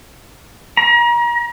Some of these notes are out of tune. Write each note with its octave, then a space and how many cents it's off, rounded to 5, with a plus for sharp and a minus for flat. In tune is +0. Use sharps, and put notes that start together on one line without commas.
A#5 +35